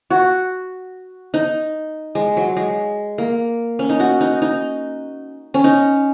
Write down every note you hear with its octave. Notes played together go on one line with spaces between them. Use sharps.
F#4
D#4
G#3
F#3
G#3
A#3
C#4
D#4
F#4
D#4
D#4
C#4
D#4